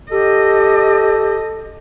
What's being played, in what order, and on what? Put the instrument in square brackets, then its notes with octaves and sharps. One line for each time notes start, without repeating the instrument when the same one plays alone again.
[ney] G4 [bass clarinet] A4 [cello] D#5